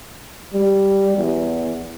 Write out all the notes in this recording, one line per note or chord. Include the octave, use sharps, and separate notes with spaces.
G3
E2